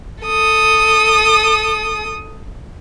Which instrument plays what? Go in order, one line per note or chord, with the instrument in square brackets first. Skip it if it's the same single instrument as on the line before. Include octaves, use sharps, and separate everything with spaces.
[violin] A4 D#6